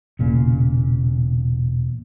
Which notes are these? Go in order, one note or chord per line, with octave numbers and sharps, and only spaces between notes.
E1 A#2 C#3